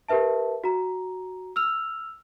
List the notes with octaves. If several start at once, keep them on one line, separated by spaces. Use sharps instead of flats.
G4 A#4 B4 E5 A5
F#4 A#5
E6 F6 F7